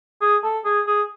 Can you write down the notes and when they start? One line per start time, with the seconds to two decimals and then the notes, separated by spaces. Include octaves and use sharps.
0.21 G#4
0.43 A4
0.64 G#4
0.86 G#4